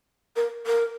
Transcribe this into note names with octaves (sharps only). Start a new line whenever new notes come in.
A#4
A#4